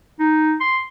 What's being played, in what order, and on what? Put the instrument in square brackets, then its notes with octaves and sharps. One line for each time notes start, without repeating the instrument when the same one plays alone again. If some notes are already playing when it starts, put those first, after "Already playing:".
[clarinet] D#4
C6